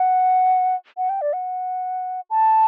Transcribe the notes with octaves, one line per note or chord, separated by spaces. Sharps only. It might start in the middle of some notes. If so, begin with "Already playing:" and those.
Already playing: F#5
F#5
G5
D5
F#5
A5